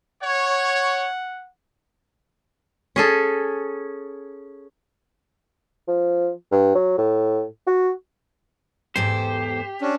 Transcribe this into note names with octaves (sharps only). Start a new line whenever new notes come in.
C#5 F#5
C#4 G#4 A4
F3
G2
F#3
A2
F#4
E2 G#2 G4 A4 C5
C#4 D4